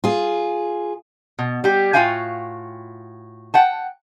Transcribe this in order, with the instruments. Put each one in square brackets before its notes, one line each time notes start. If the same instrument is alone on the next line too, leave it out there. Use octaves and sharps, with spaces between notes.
[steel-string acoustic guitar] F4 G#4
[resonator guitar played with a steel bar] B2
G3 G4
A2 F4 F#4 F5 G5 G#5
F#5 G5 A5